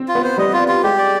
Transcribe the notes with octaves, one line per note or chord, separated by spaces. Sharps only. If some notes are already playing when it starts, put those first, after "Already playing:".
Already playing: C4
F4
B3
C5
G3 D#5
F4
F4
G#3 G4
D5